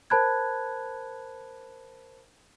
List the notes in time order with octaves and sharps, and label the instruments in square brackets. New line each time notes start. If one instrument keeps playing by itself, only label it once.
[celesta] A#4 C5 A5 B5 F#6 G#6